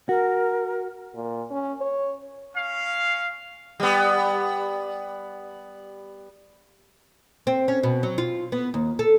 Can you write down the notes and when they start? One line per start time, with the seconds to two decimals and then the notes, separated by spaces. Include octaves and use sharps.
0.09 F#4 A#4
1.15 A#2
1.51 C#4
1.81 C#5
2.55 C#4 F5
3.80 G3 B3
7.47 C4
7.68 C#4
7.83 B2
8.03 F#3
8.18 F4
8.52 B3
8.74 D#2
8.99 A4